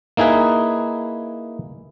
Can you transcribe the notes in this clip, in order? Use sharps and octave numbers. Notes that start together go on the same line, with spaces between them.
A#3 D#4 E4 G#4 B4